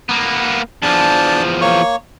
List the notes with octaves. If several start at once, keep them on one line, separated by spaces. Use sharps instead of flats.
A#3 B3
E2 F3 D4 A5
A#3 C#5 C#6